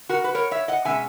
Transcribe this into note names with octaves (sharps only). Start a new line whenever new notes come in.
F#4 A#4
B4
A#4 C#5
C#5 E5
D#5 F#5
B2 G#3 C#4 E5 G#5